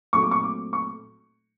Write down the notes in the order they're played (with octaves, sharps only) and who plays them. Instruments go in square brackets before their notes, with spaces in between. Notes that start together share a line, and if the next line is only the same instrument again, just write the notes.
[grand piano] A#2 F#3 A3 C4 C#6
D6
C#6
D6
C#6